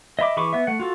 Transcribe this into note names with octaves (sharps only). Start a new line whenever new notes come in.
D#5 E5 B5 D6
E3 G#4 B5 C#6 D6
B3 E5
A3 F#5
F4 F#4 A4